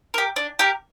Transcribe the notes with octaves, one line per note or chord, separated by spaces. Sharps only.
G4 A#4
D4
G4 A#4